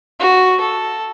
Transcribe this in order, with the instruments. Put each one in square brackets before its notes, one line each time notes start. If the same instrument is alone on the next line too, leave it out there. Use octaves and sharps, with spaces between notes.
[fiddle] F#4
A4